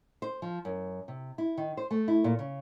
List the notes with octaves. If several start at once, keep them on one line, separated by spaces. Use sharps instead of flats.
C5
F3
F#2
C3
E4
D#3
C5
A3
E4
A#2
C#3